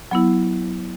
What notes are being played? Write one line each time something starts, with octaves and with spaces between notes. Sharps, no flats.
F#3 B3 E4